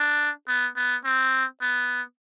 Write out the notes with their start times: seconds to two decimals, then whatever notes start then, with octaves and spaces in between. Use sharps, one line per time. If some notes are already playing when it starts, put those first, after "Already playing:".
Already playing: D4
0.47 B3
0.76 B3
1.05 C4
1.62 B3